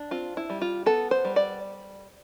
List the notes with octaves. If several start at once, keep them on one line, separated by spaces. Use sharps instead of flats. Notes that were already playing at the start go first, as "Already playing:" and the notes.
Already playing: D4
C4 F4
E4
G3
F4
B3 A4
C5
G3
D5